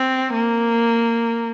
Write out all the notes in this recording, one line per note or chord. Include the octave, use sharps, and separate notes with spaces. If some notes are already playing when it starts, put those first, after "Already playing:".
Already playing: C4
A#3